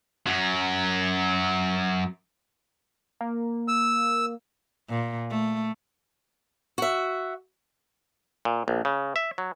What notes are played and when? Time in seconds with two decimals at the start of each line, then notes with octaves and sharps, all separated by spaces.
0.27 F#2 F#3
3.21 A#3
3.68 E6
4.89 A#2
5.30 A3
6.78 F#4 E5
8.45 A#2
8.68 A#1
8.85 C#3
9.16 E5
9.38 F#3